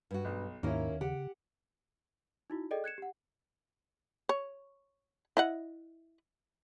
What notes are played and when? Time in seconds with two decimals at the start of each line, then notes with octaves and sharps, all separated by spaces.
0.11 G2 F#4
0.25 B1
0.63 D#2 G#2 A#3 C#4 D#4 E4 A#4
1.01 C#3 G4 F#5
2.50 D#4 E4 F#4
2.71 G#4 A4 D5 D#5 G5
2.84 F#6 G#6 C#7 E7
2.98 G4 F#5
4.29 C#5
5.37 E4 D#5 F#5